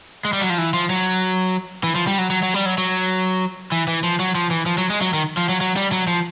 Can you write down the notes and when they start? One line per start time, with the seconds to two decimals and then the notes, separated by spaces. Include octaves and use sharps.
0.25 G#3
0.33 G3
0.41 F#3
0.50 F3
0.58 E3
0.74 F3
0.90 F#3
1.83 E3
1.95 F3
2.07 G3
2.18 F#3
2.30 F#3
2.43 F#3
2.54 G3
2.66 F#3
2.78 F#3
3.72 E3
3.88 E3
4.04 F3
4.19 F#3
4.35 F3
4.51 E3
4.66 F3
4.78 F#3
4.90 G#3
5.01 F#3
5.14 D#3
5.37 F3
5.49 F#3
5.61 F#3
5.76 G3
5.92 F#3
6.07 F3